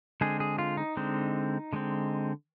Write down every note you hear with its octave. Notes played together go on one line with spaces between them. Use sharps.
D3 G#3 C4 G#4
G#4
F4
D#4
D3 G#3 C4
D3 G#3 C4